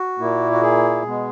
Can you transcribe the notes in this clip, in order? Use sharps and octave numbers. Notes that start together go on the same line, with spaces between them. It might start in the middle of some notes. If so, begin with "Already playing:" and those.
Already playing: F#4
A#2 A#3 E4
F#4
G#4
B2 G#3 B3